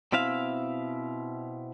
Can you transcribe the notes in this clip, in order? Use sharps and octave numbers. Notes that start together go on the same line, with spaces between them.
B2 C4 E4 E5 F5